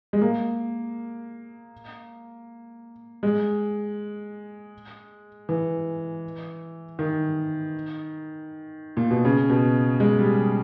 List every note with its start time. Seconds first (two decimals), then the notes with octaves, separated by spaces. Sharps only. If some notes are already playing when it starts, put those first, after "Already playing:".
0.13 G#3
0.21 A#3
3.23 G#3
5.49 E3
6.99 D#3
8.97 A#2
9.11 B2
9.25 C#3
9.50 B2
10.00 G#3
10.19 G3